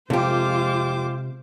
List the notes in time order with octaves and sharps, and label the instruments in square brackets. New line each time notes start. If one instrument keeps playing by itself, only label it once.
[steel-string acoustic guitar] F2 G4 [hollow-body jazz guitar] C3 [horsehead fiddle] G#3 F4 [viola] C5 D6